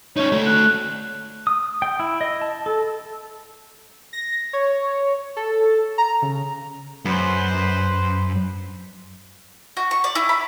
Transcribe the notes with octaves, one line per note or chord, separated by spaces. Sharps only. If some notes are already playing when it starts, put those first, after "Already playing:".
C#4 D#4 C#5
A3 F#4
F#6
D#6
G5
E4
D#5
A5
A4
A#6
C#5
A4
A#5
C#3
F#2 B4 C5
F#4
C#6
D5
E4
B5